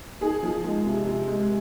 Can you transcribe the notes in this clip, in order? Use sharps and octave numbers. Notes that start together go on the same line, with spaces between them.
D#4 G#4
F3
G#3
C3
C3
G#3